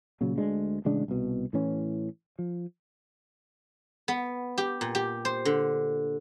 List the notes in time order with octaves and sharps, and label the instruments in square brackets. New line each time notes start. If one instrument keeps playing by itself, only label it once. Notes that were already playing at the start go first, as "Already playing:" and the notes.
[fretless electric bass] A#2 C#3 F#3
D2 G#3 D4
A1 C#3 G#3 D4
C2 B2
A2 E3 C#4
F3
[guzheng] B3
G4
A#2
G4
C5
D3